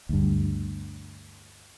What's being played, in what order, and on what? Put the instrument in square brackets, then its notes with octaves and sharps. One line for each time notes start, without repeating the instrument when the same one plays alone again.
[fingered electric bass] D2 G2